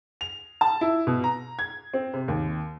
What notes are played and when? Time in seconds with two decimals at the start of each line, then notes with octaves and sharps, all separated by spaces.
0.21 F7
0.61 A5
0.81 E4
1.07 B2
1.24 A#5
1.59 G#6
1.94 C4
2.14 C3
2.28 D#2